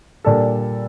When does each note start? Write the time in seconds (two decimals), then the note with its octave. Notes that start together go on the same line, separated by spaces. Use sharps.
0.24 A#2 G3 D4 A4